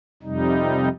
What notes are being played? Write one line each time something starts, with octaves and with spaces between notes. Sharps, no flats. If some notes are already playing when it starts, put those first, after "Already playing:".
F2 C3 G3 D#4